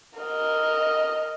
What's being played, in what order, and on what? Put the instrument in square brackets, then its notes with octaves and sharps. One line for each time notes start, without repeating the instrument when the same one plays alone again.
[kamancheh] A#4 D#5